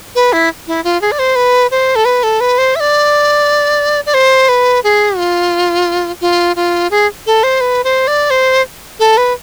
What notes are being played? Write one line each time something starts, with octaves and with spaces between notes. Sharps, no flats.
B4
E4
E4
F4
G#4
D5
C5
B4
C5
A4
B4
A4
B4
C5
E5
D5
D5
C5
B4
G#4
F4
F4
F4
G#4
A4
C5
B4
C5
D5
C5
A4
B4